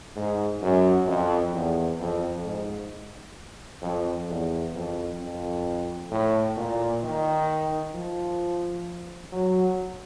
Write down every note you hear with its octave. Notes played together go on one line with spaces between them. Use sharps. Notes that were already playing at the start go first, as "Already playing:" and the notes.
G#2
F#2
F2
E2
F2
G#2
F2
E2
F2
F2
A2
A#2
D#3
F3
F#3